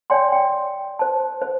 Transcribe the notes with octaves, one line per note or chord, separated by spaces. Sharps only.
C#5 D5 G5 G#5 C6
G5
C5 A5
C5